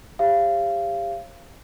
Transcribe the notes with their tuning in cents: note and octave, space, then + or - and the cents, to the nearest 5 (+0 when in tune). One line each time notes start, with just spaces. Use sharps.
G4 +30 C#5 -45 F5 -25